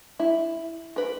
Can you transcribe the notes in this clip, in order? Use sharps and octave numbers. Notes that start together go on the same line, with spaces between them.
E4
A#4 B4